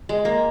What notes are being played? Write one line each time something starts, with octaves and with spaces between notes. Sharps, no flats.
G#3
A#3